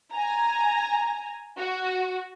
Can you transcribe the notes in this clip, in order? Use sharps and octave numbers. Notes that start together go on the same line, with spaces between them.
G#5 A#5
F#4